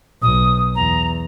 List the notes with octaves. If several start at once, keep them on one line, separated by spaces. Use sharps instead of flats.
B1 D#6
E2 A#5